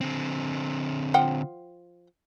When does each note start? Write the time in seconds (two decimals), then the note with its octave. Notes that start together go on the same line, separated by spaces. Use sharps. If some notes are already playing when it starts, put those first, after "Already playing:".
0.01 D3 C4
1.14 F3 F#5 G5